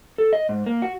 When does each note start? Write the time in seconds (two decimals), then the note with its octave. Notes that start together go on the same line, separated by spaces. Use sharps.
0.18 A4
0.33 D#5
0.49 G#2
0.66 A#3
0.82 F#4